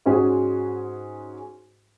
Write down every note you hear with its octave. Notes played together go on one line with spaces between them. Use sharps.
G#2 C#4 F#4 G#4